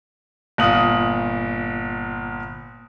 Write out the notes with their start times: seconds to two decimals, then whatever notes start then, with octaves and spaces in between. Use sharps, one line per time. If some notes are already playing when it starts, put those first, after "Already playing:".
0.58 G1 A#2 F4 D#6 F#7